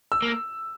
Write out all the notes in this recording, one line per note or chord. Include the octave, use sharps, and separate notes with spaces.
E6
A#3